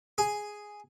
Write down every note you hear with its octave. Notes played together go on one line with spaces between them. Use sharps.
G#4